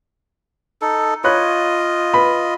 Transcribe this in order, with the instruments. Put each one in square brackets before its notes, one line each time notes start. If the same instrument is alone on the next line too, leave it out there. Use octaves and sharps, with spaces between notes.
[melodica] D#4 A4
[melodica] F4 D#5 [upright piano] C#5 B5 F#6
[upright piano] B4 B5